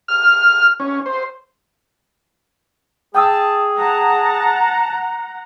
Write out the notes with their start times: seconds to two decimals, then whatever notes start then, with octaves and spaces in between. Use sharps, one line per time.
0.08 F6
0.80 C#4
1.06 C5
3.15 G#4 G5 A5 D#6 E6
3.78 F#5 A5 A#5